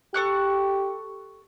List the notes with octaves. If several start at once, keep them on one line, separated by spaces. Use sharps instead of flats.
G4 A4 C#6 F#6